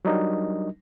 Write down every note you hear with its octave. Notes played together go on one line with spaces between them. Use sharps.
F#3 G3 D4 D#4 A#4 D#5